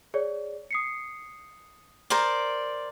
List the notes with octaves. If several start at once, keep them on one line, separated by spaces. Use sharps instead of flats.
G#4 C#5 D5
D#6 C7 C#7
A#4 C5 D5